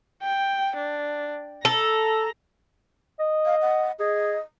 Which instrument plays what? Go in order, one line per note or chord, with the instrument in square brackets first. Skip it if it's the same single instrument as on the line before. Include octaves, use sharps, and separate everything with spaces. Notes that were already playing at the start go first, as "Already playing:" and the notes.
[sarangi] G5
D4
[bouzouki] A4 [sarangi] A#5
[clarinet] D#5
[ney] F5
F#5
[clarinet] G#4 [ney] D#5